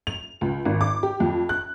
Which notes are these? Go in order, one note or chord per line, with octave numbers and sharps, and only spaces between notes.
F7
C#2
G#1
D6
G4
F2
F#6